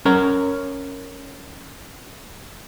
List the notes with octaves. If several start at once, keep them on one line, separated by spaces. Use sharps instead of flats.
C#4 A#4 A#5